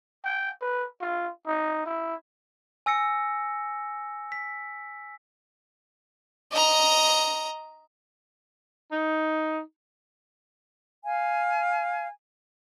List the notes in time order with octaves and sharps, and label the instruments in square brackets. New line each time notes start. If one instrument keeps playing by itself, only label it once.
[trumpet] G5
B4
F4
D#4
E4
[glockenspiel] G#5 E6 A#6 C#7
B6
[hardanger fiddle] D#5 A#5
[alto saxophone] D#4
[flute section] F5 G#5